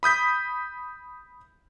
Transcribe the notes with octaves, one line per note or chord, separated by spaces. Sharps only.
B5 D#6 G6 B6